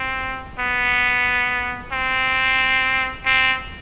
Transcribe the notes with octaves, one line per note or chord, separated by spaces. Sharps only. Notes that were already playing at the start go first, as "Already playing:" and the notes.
Already playing: C4
B3
C4
C4